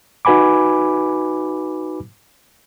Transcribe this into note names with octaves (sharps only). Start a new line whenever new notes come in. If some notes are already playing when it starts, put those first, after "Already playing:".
D#4 F#4 B4 G#5 B5 D6